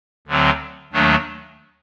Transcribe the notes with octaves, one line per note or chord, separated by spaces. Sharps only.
D2 D3 F#3 C4
D#2 D#3 F#3 A3 D4